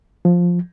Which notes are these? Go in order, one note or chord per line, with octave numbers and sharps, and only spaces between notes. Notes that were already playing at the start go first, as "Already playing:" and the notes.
F3